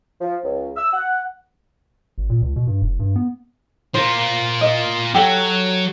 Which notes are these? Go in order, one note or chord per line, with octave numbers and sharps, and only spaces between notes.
F3
C#2
E6
F#5
G#1
A#2
C#2
B2
G2
F1
G2
B3
A#3 F4 C5
D#5
F#3 G4 A4 F#5